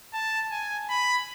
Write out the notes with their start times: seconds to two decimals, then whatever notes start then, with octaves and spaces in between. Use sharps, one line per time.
0.13 A5
0.51 G#5
0.90 B5